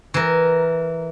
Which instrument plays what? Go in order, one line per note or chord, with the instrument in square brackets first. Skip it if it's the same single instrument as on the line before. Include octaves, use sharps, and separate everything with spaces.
[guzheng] E3 A#4